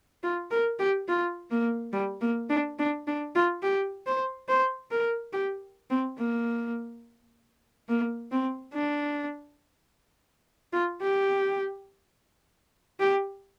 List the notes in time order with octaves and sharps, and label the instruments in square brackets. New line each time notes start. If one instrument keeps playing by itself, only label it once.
[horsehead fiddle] F4
A#4
G4
F4
A#3
G3
A#3
D4
D4
D4
F4
G4
C5
C5
A#4
G4
C4
A#3
A#3
C4
D4
F4
G4
G4